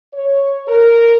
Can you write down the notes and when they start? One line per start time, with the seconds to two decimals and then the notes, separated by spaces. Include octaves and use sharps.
0.14 C#5
0.68 A#4